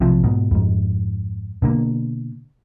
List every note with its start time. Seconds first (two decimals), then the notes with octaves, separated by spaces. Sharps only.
0.01 B1 C3 F3
0.24 G#2 B2
0.51 F2 G#2
1.62 B2 D3 A#3